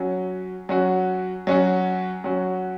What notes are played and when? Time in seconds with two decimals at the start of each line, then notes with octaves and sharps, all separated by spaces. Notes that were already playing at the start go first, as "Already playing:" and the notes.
Already playing: F#3 C#4 F#4
0.69 F#3 C#4 F#4
1.47 F#3 C#4 F#4
2.24 F#3 C#4 F#4